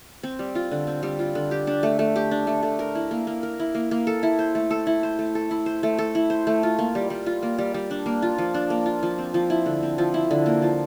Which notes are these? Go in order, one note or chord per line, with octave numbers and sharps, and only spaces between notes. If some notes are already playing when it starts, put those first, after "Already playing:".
C4
G3
F4
D3
C4
G3
F4
D3
G4
D4
A3
A3
G4
D4
A3
A3
A#4
E4
A#3
A#3
A#4
E4
A#3
A#3
A4
E4
C5
A3
A4
E4
C5
A3
A4
E4
C5
A3
A4
E4
C5
A3
F4
A#3
G3
G3
F4
A#3
G3
G3
D4
A#3
F4
F3
D4
A#3
F4
F3
C4
F3
E4
D3
C4
F3
E4
D3
A#3
F3